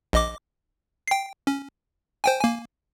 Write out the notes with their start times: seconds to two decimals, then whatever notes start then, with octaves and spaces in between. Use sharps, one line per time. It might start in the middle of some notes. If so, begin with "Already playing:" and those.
0.13 A#1 D#5 D6
1.08 G5 C7
1.47 C#4
2.24 C5 G5 G#5
2.40 A#3 G#5